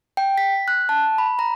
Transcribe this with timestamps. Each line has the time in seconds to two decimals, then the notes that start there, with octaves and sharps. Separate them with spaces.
0.17 G5
0.38 B6
0.68 F#6
0.89 A5
1.18 B5
1.39 A#5